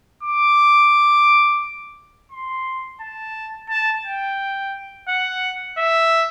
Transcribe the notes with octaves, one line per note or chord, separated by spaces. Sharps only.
D6
C6
A5
A5
G5
F#5
E5